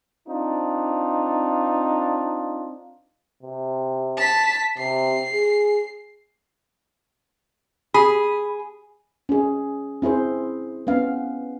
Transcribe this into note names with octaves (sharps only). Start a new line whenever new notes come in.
C4 D4 D#4 F4
C3
A5 B6
C3 C7
G#4
G#4 B5
C#4 G#4
C4 E4 G#4 C5
B3 C#4 F5